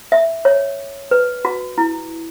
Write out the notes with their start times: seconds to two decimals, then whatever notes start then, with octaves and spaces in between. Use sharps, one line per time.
0.12 E5
0.45 C#5
1.11 B4
1.45 F#4
1.78 E4